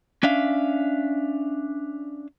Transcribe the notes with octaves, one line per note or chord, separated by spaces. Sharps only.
C#4 D4 E5 F5